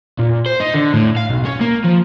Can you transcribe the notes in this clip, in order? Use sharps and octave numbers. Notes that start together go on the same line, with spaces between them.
A#2
C5
D#4
D3
A2
F5
B1
C#4
A#3
F3